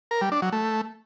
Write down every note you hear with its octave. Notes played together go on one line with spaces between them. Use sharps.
A#4
G3
D4
F#3
A3